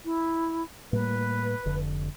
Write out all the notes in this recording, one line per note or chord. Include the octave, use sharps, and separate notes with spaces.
E4
A2 G3 A#3 B4
F1 D3